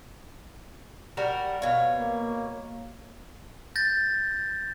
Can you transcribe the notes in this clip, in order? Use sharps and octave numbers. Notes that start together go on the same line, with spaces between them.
G3 F#4 A#4
B2 C#5 F5
A#3
G6 A6 A#6